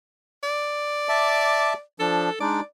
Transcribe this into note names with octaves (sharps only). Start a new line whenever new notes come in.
D5
E5 A5 D6
F3 D4 A4
G#3 D4 D#4 D5